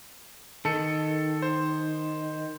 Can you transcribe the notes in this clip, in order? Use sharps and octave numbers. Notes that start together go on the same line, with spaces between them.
D#3 A4 C#7
C5